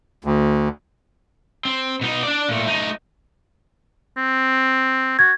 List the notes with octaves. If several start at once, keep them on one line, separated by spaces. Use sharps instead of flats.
D2
C4
B2 D#4
D4 D5
A#2 A3
A3 D#4
C4
F#4 G#6